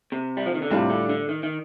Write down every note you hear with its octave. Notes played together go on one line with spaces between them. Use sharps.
C3
G3
F3
D#3
D3
A2 C3 G3 D4 F4
D3
D3
D#3
D#3